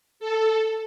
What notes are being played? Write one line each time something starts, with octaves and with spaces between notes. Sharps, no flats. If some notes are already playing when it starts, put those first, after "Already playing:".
A4